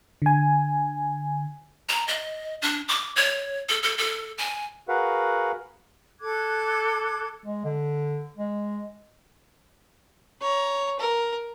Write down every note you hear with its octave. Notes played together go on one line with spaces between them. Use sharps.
D3 G#5
A#5
D#5
D4
D6
C#5
A4
A4
A4
G#5
F#4 G#4 A#4 B4 F5 F#5
A4 D6 F#6 G#6
G#3
D3
G#3
C#5 A#5
A#4